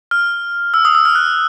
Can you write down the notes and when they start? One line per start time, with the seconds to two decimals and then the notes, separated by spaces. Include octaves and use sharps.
0.11 F6
0.74 E6
0.85 D#6
0.95 E6
1.05 F6
1.15 F#6